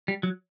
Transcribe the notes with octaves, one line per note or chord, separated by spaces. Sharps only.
G3
F#3